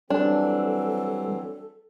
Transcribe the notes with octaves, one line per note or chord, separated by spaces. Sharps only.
E3 F#3 G3 C4 D4 A4